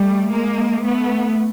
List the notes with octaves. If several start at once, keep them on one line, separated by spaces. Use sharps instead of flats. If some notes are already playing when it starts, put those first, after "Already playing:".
Already playing: G3 A3
G#3 A#3
A3 B3